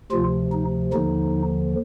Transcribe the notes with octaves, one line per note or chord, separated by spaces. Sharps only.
D2 C3 F3 F4
D#4
D#2 D3 F3 D#4